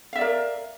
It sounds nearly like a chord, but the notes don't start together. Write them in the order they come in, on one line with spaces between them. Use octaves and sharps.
F5 E5 D5 A#4